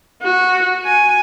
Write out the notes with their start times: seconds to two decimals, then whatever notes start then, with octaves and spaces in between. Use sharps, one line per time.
0.23 F#4
0.85 G#5